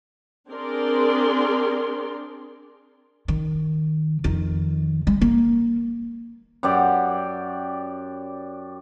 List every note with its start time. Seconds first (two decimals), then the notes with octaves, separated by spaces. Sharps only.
0.49 C4 D4 G#4 A#4 D5 C6
3.28 D#3
4.24 F2 D#3
5.07 G#3
5.21 A#3
6.63 F#2 G4 D5